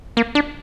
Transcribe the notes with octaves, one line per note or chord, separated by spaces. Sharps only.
A#3
D4